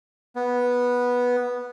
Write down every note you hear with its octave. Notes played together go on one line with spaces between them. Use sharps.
B3